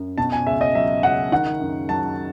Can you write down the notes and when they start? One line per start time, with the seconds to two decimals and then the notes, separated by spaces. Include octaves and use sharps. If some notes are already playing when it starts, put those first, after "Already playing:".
Already playing: F#2
0.18 B2 A5
0.32 G#5
0.47 C#2 E5
0.61 D#5
0.75 F#3 E5
1.03 C#2 F#5
1.32 D#3 F#5
1.60 F#2
1.88 F#3 A5